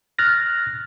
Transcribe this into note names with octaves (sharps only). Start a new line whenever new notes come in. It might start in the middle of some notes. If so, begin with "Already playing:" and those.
F6 F#6 A6 A#6